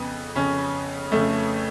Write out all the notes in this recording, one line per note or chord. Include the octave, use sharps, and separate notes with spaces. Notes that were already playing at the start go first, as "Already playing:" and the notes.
Already playing: F2 C#3 B3
F2 C#3 C#4
F2 C#3 A3